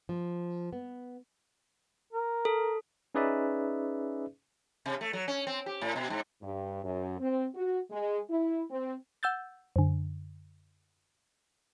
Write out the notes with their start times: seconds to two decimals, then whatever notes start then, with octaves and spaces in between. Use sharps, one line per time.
0.09 F3
0.73 B3
2.13 A#4
2.45 A4
3.15 C#4 D#4 G#4 B4 D5 E5
4.86 C3
5.01 A3
5.13 F#3
5.28 C#4
5.47 C4
5.66 G4
5.81 A2
5.96 B2
6.10 G#2
6.42 G2
6.84 F#2
7.19 C4
7.54 F#4
7.91 G#3
8.30 E4
8.69 C4
9.23 F#5 E6 G6 A6
9.76 F#2 D3